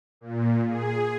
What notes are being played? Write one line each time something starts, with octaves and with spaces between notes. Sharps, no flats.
A#2
G#4